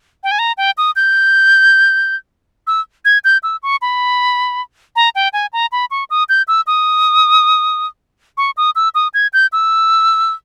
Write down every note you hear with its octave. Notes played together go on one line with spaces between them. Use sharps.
G5
G#5
A#5
G5
D#6
G6
E6
G#6
G6
E6
C#6
B5
A#5
G5
G#5
A#5
B5
C#6
D#6
G6
E6
D#6
C#6
D#6
E6
D#6
G#6
G6
E6